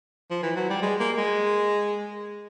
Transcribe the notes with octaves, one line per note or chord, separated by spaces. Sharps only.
F3
E3
F#3
G3
G#3
A#3
G#3